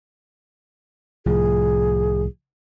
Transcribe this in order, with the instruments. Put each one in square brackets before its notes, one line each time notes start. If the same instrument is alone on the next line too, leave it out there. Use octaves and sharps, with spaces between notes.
[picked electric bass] C2 A2 F3 [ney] G#4